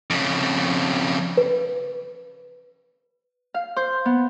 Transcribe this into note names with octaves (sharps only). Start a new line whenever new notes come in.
F2 C#3
B4
F5
C5
B3